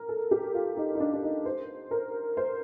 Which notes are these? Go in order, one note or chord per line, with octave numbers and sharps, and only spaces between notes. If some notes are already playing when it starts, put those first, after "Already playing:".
Already playing: A#4
A4
G4
F4
D#4
D#4
D4
D4
D#4
C5
A#4
C5